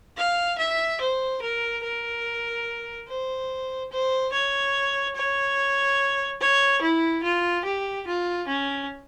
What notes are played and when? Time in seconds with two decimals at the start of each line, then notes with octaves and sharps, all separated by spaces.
0.17 F5
0.58 E5
1.01 C5
1.42 A#4
1.84 A#4
3.08 C5
3.91 C5
4.32 C#5
5.15 C#5
6.41 C#5
6.82 E4
7.23 F4
7.65 G4
8.07 F4
8.48 C#4